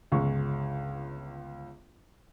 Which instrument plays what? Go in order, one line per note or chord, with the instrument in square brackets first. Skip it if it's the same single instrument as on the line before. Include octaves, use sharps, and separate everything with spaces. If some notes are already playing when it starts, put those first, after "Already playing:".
[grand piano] G1 C#2 G#3 C#6